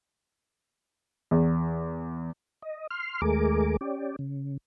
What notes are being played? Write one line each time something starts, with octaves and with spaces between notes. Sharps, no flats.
E2
D#5
C6 F6
D#2 G#3 A3 G#4 A#4 D6
C#4 G4 D5
C#3